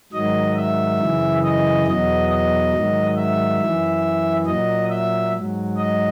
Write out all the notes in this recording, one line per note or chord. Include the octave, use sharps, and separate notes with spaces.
G#2 D#3 F#3 D#5
E5
F#2 C#3 E3
D#5
E2 B2 F#3 D#5
D#5
G#2 D#3 F#3
E5
F#2 E3
A#2 F#3 D#5
E5
G#2 F#3
D#5